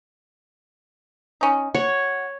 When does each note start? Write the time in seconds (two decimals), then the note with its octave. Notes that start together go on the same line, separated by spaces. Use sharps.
1.41 C#4 D#4
1.75 F#4 C#5